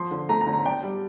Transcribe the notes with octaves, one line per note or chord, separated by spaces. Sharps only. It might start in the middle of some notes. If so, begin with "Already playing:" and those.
Already playing: F3 C6
D3
A3 A#5
A#5
D3
A#5
D4 G5
G3